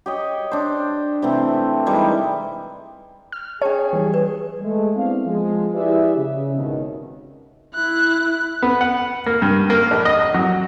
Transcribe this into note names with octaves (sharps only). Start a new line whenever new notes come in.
G4 C#5 D#5
D4 C5
C3 E3 A3 C4
D#3 E3 G3 G#3
F6
C#4 G#4 C#5 A5
E3 G3
G#4 B4 D5
G#3 A3
B3 C4 D4 E4 F5
F3 G#3
E4 G4 G#4 B4 D5 E5
C#3
G#1 B2 D#3
E4 F#6
B3
F#5
A#3
G2
A#3
A#1
D#5
D#5
F#3